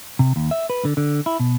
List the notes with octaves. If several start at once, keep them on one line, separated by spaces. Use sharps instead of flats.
C3
D#2
E5
B4
D3
D3
E4
B2